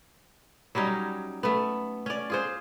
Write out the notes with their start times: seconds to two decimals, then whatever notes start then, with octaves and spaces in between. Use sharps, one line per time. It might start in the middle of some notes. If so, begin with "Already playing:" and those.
0.75 F#3 G3 C#4 D#4
1.43 A3 B3
2.06 C#4 D5
2.30 F4 G#4 C5